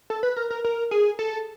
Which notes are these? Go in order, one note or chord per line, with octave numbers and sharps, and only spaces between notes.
A4
B4
A#4
A#4
A#4
G#4
A4